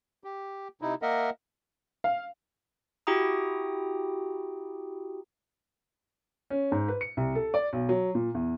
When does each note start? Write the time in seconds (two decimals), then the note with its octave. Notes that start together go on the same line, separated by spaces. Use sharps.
0.24 G4
0.81 C3 D#4 E4
1.02 A#3 A#4 D#5 E5 F#5
2.04 F5
3.07 E4 F#4 G4 G5 A#5 D#6
6.50 C#4
6.72 G#2
6.88 B4
7.01 C#7
7.17 C2
7.35 A4
7.54 D5
7.73 B1
7.89 F#3
8.15 A#2
8.34 E2